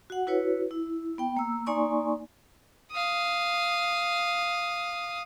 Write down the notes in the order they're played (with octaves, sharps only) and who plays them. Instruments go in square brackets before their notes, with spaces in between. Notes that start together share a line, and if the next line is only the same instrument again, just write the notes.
[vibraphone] F#4 F#5
E4 F#4 B4 C#5
E4
B3 G5
A#3 E6
A#3 D#4 D5 G#5 C6 C#6
[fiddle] F5 D#6